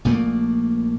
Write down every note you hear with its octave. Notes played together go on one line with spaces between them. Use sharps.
A#1 A#2 A3 A#3